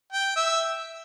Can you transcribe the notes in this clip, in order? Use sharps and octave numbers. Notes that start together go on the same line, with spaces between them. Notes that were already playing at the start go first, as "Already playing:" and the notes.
G5
E5